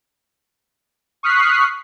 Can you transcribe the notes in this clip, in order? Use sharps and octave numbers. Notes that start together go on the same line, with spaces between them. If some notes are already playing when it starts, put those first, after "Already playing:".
C#6 D#6 F6 F#6 B6 C7